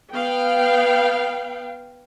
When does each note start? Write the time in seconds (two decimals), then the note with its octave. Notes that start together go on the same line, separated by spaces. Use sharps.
0.12 B3 F5 G5